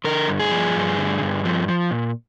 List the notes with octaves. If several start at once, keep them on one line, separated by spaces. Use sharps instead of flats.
D3 A#4
G2
G#4
F3
G2
D3
G2
F3
F3
A#2